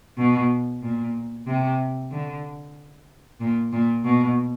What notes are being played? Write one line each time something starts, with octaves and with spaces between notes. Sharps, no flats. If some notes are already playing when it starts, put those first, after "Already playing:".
B2
A#2
C3
D3
A#2
A#2
B2